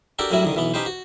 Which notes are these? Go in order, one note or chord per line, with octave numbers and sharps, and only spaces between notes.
D4 F#4 G4 A4 A#4
F#2 A2 F#3 G3 E4 F#4
C2 D3 D#3
B1 E3 B3
C#4 D#4 G4 B4 C5
F#4